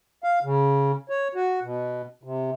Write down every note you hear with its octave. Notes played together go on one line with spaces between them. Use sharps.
F5
C#3
C#5
F#4
B2
C3